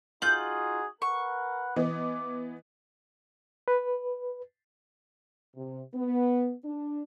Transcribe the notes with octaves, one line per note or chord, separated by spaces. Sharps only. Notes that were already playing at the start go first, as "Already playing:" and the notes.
D#4 F4 F#4 G#4 G6 F#7
A#4 B4 F#5 C#6
E3 B3 D#5 D6
B4
C3
B3
D4